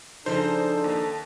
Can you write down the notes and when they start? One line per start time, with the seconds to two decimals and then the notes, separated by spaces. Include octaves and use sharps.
0.26 C#3 F3 D4 D#4 A4 C5
0.84 D#2